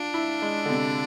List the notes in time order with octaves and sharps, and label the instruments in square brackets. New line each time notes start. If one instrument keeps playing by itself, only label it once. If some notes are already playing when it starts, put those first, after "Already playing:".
Already playing: [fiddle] D4 [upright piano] F4
[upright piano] E4
G#3
D3
C3